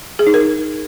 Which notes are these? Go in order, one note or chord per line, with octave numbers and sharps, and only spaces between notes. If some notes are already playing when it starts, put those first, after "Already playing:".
G#4
D#4
A#4